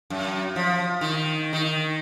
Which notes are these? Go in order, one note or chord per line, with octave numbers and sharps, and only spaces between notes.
F#2
F3
D#3
D#3